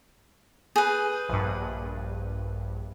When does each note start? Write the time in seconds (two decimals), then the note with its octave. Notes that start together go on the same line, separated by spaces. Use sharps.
0.76 G#4 B4 G6
1.29 A#1 G2